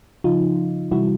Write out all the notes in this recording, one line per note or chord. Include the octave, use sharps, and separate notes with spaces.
C#3 F3 D#4 F4
C3 E3 G3 E4 F#4